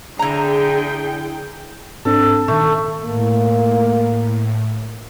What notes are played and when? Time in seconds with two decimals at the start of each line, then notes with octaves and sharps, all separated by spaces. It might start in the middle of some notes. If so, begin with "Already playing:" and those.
0.19 D3 E4 G#4 G5 A#5
2.05 G#2 C4 D4 A4
2.48 A#2 D#3 A3
3.05 A2 A#3